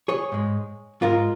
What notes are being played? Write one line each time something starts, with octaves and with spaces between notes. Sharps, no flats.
G#4 C#5
G#2 G#3
G#2 G#3 F4 A#4